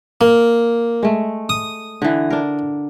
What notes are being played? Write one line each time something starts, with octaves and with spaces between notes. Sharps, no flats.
A#3
G#3 A3
D#6
D3 E3
D4 A#4